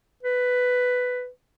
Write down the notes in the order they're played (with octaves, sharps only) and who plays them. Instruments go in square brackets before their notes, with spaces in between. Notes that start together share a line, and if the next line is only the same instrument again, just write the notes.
[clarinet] B4